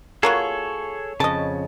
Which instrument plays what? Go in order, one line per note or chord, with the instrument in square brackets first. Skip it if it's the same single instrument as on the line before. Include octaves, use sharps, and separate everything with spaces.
[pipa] A#3 F4 F#4 [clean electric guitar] G#4 A4 [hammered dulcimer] C#5
[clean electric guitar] F2 C#3 [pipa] D#5 A5